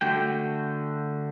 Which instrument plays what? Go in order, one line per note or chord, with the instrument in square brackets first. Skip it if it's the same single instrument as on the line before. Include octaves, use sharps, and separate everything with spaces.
[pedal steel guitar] D3 A3 F#4 G5